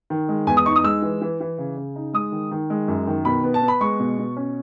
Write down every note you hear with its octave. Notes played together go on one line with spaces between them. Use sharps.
D#3
G#3
E2 G#5
D#6
D#4 C#6
D#6
G#3 E6
E3
E3
E3
C#3
C#3
D#4
G#3 D#6
D#3
D#3
G#3
F#2
D#3
B2 B5
B3
A5
B3
B5
G#3 C#6
B2
B2
C#4